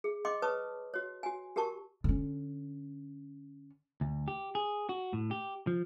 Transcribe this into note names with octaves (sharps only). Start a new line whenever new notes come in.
G#4
D#5 G5 C6 D6
B4 C#5 A5 C#6 D#6
F#4 C#5
F#4 G#5
F#4 G4 A#4 A5 C#6
D3 C#4
D2
G4
G#4
F#4
A2
G4
F3